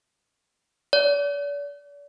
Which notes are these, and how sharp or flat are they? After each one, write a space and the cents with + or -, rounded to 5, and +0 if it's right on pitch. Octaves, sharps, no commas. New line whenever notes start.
D5 -40